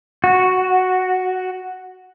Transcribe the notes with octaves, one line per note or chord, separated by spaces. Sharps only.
F#4